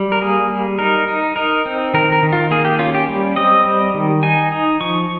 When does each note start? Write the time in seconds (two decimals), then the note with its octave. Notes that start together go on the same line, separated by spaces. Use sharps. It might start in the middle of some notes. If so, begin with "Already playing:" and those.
Already playing: G3
0.12 A#4
0.22 A#3 G#4
0.50 G3
0.79 D#4 A#4
1.08 D#4
1.36 D#4 A#4
1.66 C4
1.94 D#3 A#4
2.12 A#4
2.23 D#3
2.32 F4
2.51 A#3 G#4
2.65 G4
2.79 C#4 F4
2.95 G4
3.08 G3
3.36 C4 D#5
3.65 G3
3.94 D#3
4.23 D#4 G#5
4.52 D#4
4.81 F3 C#6